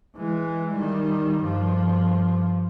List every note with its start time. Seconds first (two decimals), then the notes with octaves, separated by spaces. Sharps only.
0.16 E3 G#3
0.73 D#3 G3
1.42 G2 F3